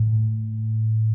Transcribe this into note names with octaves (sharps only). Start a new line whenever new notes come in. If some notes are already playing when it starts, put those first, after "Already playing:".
Already playing: A2